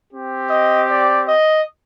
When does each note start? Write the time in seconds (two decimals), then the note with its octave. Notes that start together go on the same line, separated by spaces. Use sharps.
0.12 C4 G4
0.50 D#5
0.87 D5
1.26 D#5